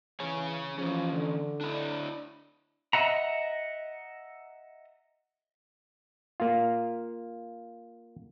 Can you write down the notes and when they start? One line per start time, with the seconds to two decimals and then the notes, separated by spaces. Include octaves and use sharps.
0.20 E3 G#4 C#5 G#5
0.78 E3 F3 C#4
1.13 D3
1.61 D4 E4 D5
2.93 D#5 E5 F#5 A#5
6.40 A#3 F4